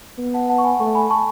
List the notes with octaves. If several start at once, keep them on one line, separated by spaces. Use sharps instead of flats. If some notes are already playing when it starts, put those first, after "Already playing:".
B3
F#5 A5
F#5 A5
C#6
G#5 B5
A3 A5 C#6
G#5 B5
A5 C#6